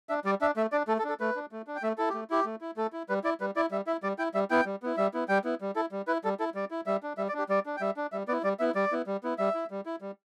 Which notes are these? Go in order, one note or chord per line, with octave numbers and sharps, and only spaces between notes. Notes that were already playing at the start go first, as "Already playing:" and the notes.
D4 E5
G3 D5
D4 E5
A3 E5
D4 D5
A3 A4
A4
D4
A4
A3 B4
D4
A3
D4
G5
A3 E5
E4 A4
A3 G4
E4 G4
A3
E4
A3 A4
E4
G3 B4
E4 D5
G3 B4
E4 D5
G3 E5
E4 E5
G3 D5
E4 G5
G3 E5
B3 E4 G5
G3
B3 E4
G3 E5
B3 E4
G3 G5
B3 E4
G3
E4 A4
G3
E4 B4
G3 A4
E4 A4
G3 D5
E4
G3 E5
D4
G3 E5
D5
D4 G4
G3 D5
D4
G5
G3 E5
D4
G3 E5
B3 E4 D5
G3 D5
B3 E4 E5
G3 D5
B3 E4
G3
B3 E4
G3 E5
E4
G3
E4
G3